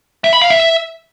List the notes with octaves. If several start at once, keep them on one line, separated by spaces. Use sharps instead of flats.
E5
B5
F5
E5